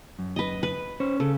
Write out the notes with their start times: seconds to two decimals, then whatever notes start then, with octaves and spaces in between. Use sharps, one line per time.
0.19 F#2
0.36 B4 D#5
0.63 B4
1.00 C#4 C5 C#5
1.20 C#3 A4